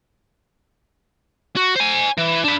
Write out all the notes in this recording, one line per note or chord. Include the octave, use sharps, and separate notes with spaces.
F#4
C5 G#5
E3
D4 B4